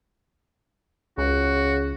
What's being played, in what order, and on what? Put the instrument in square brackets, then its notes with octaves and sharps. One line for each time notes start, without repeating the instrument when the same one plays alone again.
[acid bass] C#2 [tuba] C#3 [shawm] F#4